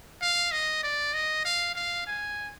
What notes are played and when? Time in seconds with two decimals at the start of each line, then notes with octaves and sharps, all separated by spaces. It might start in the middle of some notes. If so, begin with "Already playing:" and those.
0.22 F5
0.52 D#5
0.83 D5
1.14 D#5
1.45 F5
1.75 F5
2.07 G#5